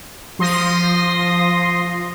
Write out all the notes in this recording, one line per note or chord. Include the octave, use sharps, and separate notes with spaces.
F3 C6 D#6 A#6